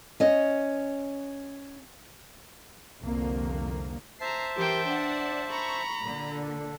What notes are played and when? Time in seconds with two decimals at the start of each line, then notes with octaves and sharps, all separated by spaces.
0.20 C#4 D#5
3.01 C2 F2 D3 A#3
4.21 C5 E5 A5 A#5 C7
4.56 E3 G4 A#4 G5 C6
4.87 D4 D5 F#5
5.50 A#5 B5 C#6
6.00 A#2 D3
6.31 D4 A4